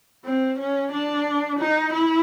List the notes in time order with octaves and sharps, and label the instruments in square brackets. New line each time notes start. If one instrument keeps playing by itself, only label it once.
[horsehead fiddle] C4
C#4
D4
D#4
E4